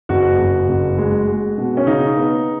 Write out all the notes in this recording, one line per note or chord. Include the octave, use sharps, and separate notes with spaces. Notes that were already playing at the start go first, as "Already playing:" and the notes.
F#1 F#4
F#1
F#1
G#3
G#3
B2
C#4
C#3 D#4
B3